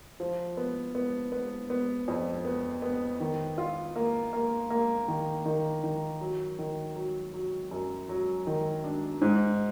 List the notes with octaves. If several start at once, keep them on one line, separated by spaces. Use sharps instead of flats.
F3
B3
B3
B3
B3
F2
B3
B3
D#3
F4
A#3
A#3
A#3
D#3
D#3
D#3
F#3
D#3
F#3
F#3
F#2
F#3
D#3
D4
G#2